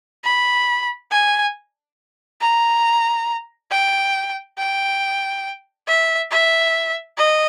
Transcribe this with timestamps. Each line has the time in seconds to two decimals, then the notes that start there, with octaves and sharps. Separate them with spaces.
0.24 B5
1.11 G#5
2.41 A#5
3.71 G5
4.58 G5
5.87 E5
6.31 E5
7.17 D#5